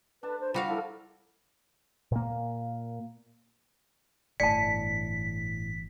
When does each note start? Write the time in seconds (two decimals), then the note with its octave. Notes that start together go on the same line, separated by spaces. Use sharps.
0.23 D4 B4 A5
0.40 C5
0.54 G3 F4 F#4 F5
0.68 F3 E4 A4 A#4
2.12 A#2 A#3
4.40 G1 A2 E3 D5 A5 B6 C#7